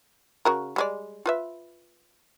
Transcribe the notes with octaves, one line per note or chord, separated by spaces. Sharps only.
C#3 F#4 A#4
G3 G#3 D5
F4 B4 E5